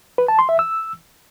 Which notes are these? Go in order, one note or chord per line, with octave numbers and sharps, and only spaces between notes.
B4
A5
C6
E5
E6